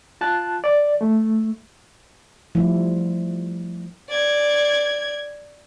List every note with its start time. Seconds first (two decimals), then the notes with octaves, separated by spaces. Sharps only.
0.21 F4 A5 F#6
0.64 D5
1.01 A3
2.55 F3 G3 A3 E4
4.09 D5 G#6